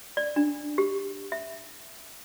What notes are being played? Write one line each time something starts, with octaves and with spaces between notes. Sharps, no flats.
D5
D4
G4
E5